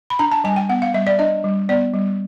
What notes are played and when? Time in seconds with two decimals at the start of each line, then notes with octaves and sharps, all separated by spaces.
0.10 B5
0.19 D4 A#5
0.31 A5
0.44 G3 G#5
0.56 G5
0.69 B3 F#5
0.82 F5
0.94 G3 E5
1.07 D5
1.19 D4 D#5
1.44 G3
1.69 B3 D5
1.94 G3